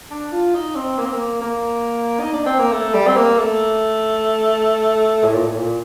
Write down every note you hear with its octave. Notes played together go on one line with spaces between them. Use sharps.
D4
F4
D#4
C4
A#3
C4
A#3
A#3
D#4
D4
C4
A#3
A3
G3
C4
A#3
A3
A2
A#2
A2
A#2